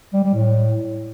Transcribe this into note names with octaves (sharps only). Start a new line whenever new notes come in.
G3
G3
A2